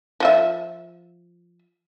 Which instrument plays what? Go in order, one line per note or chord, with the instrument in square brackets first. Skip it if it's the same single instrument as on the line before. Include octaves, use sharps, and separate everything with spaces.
[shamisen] F3 F4 E5